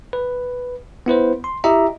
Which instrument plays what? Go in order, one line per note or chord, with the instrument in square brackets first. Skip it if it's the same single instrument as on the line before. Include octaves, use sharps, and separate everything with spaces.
[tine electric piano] B4
B3 E4 B4 C5
C6
E4 G4 D#5 E5 A#5